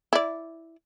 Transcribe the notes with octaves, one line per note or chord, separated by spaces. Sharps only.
E4 D5